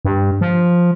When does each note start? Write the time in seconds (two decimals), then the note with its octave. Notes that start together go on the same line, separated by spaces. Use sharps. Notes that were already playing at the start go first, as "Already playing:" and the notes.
0.05 G2
0.41 F3